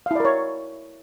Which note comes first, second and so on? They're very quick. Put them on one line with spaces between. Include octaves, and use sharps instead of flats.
F5 E4 D5 A#4 C#5